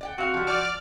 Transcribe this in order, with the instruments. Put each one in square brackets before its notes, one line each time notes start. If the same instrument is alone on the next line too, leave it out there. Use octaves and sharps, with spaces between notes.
[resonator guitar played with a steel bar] D5 F#5 G5
[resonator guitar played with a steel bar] C4 F5 [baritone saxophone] F#4
[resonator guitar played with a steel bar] F3 G3
[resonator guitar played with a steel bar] F3 [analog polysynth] D5 D6 F6